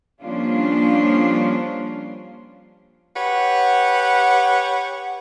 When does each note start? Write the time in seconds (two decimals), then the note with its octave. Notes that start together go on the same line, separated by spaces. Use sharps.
0.22 F3 G3 A#3 C#4 D4 F4
3.17 G4 B4 C#5 F#5